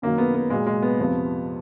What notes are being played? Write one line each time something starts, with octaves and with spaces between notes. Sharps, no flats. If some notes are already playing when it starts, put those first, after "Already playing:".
F#2 D#3 F#3 A#3
B3
B3
A#2 F#3 G#3
G#3
B3
F2 C3 F3